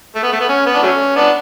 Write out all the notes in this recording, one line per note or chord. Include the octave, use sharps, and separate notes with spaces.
A3
B3
A3
B3
C#4
B3
D4
F#3 A3 C#4
B3 D4